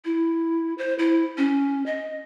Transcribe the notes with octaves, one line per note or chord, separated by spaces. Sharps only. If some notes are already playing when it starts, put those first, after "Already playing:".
E4
C5
E4
C#4
D#5